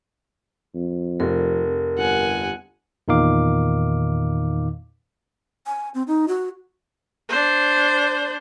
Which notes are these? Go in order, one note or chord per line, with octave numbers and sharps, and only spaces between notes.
F2
F1 A#4
G1 F#5 G#5
E2 A#2 D#3 D#4 F5 D6
G#5
C4
D#4
F#4
D4 C5